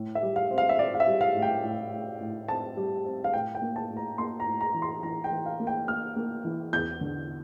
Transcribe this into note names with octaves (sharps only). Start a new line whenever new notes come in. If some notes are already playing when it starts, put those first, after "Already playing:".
Already playing: A2
E5
G3
F5
C4
F5
E5
C4 D5
F5
E5
G3
F5
A2
G5
A2
A2
A2
C4 A5
G3
C4
F5
A2 G5
G5
A#3
A5
A2
A#5
A#3 C6
A#5
A2
A#5
E3
C6
E3 A#5
G5
E3
F5
A#3
G5
A#3 F6
A#3
E3
E2 G6
D3